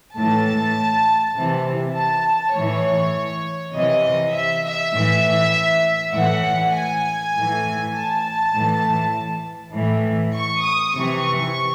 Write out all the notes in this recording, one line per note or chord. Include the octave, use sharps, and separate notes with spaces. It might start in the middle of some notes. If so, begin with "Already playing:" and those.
A2 E3 A5
C3 E3
A5
A2 E3 C#5
C3 E3 D#5
E5
E5
A2 E3
A2 E3 F#5
G#5
A2
E3
A5
A2 E3
A2 E3
C#6
D#6
C3 E3 C#6